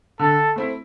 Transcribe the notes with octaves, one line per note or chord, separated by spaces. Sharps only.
D3 A4
A3 C4 E4